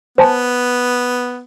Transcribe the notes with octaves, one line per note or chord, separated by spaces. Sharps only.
B3 C5 G#5 A5